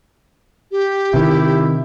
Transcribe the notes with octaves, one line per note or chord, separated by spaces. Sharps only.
G4
C3 D#3 E4